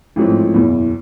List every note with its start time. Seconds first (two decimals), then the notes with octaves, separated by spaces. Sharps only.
0.16 A1 G#2 F3 A3 C4
0.54 F#1 E2 B2